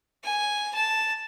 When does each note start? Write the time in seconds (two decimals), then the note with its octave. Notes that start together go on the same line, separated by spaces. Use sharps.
0.24 G#5
0.75 A5